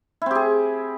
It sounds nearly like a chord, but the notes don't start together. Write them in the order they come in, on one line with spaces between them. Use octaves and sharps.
E4 C4 G4 G#4